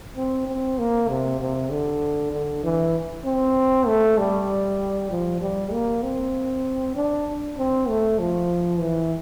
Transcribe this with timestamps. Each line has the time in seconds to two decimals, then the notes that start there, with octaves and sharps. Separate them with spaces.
0.17 C4
0.47 C4
0.79 A#3
1.09 C3
1.40 C3
1.71 D3
2.32 D3
2.64 E3
3.25 C4
3.87 A3
4.18 G3
5.11 F3
5.41 G3
5.72 A#3
6.03 C4
6.96 D4
7.58 C4
7.89 A3
8.19 F3
8.80 E3